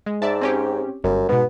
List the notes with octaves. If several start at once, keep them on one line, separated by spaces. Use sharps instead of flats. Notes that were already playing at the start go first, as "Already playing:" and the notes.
G#3
G#2 D5 E5 A5
C4 C#4 G4
G1 F#2
G#2 B2 B3